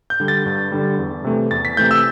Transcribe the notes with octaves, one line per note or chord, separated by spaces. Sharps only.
G6
D3 G3
A6
G2
D3 G3
E2
C3 E3 A3
E2 A6
B6
C3 E3 A3 G6
E6